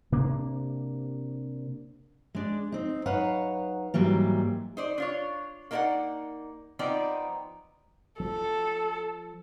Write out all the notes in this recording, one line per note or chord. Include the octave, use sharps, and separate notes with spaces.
C3 A#3 D4
G#3 D4
C4 D#4
F#3 D#4 B4 C#5 F5 F#5
G#2 E3 F#3 G3 A#3
D#4 C5 D5
D4 F4 C#5
A#3 D#4 A4 A#4 D5 F#5
F3 B3 C4 D#4 D5
F3 A4